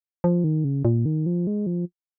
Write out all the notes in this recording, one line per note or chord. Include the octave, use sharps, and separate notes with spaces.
F3
D#3
C#3
A#2
D#3
F3
G#3
F3